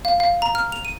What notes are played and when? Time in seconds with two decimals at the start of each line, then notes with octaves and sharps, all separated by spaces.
0.05 F5
0.20 F5
0.42 A#5
0.55 F6
0.72 F7
0.85 D#7